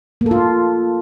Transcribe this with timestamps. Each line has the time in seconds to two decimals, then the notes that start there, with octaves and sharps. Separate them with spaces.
0.21 A#3
0.26 A4
0.31 F4